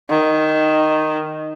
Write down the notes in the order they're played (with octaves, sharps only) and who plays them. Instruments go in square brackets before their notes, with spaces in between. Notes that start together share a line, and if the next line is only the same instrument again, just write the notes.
[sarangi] D#3